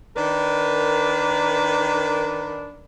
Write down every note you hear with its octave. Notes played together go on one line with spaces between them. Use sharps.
D#3 D4 A#4 B4